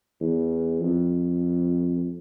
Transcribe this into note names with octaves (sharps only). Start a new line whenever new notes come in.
E2
F2